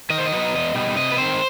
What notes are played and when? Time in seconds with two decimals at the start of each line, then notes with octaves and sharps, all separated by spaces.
0.10 D#3 D#5
0.18 C5
0.26 D#5
0.31 F#3 B3 D#4
0.54 E2
0.75 B2 G3 D#4
0.96 C3 D#5
1.12 B4
1.17 D#3 G3 C4 C5